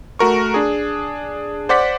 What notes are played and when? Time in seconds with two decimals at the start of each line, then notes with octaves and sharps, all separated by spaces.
0.19 A3 F#4 A#4 C#6
0.54 D4 G#4
1.69 C5 D5 F#5 D6 B6